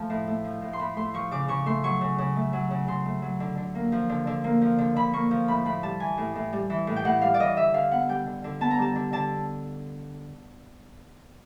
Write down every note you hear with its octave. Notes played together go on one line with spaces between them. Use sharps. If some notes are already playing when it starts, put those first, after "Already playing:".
Already playing: F3 A3 A5
A2
A3
F3
A2
C6
A2 B5
A3 C6
F3 C#6
C#3 D6
C#3 C#6
A3 C6
F#3 C#6
C#3
C#3
A3
F#3
C#3
C#3 C6
A3
F#3
D3
D3
A#3
F3
D3
D3
A#3
F3
D3
D3 B5
A#3 C#6
F3
A2 B5
A2 B5
G3 A5
E3 G#5
A2
A2
G3
E3
A2
G5
A2 F#5
G3 F5
D5
E3 D#5
D3 E5
D3 F5
B3 F#5
G3 G5
D3
D3
B3 A5
A#5
G3 A5
D3
D3 A5